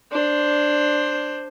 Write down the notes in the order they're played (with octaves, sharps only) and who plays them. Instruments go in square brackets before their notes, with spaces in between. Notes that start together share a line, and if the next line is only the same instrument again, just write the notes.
[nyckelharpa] D4 C5